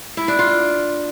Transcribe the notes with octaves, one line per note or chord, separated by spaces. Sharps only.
E4
D4
F4